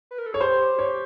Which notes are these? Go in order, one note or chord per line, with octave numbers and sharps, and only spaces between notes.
B4
A#4
A4
G#4 C#5
G4 C5
G4 C#5